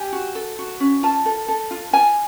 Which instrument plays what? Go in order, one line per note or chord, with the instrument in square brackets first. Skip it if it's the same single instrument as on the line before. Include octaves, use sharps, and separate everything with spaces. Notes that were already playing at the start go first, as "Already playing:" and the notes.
Already playing: [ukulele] G4 G#5
F#4
A4
F#4
C#4
F4 A5
A4
A4
F4
F4 G#5